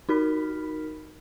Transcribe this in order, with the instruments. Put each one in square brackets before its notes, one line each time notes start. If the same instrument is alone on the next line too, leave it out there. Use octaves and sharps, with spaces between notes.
[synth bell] D#4 F#4 A#4 B5 F6 B6